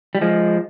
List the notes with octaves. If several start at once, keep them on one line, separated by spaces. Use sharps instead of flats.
G3
F3 G#3